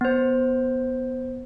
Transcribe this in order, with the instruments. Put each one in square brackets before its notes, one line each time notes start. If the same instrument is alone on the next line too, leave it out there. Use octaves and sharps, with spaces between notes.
[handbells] B3 C5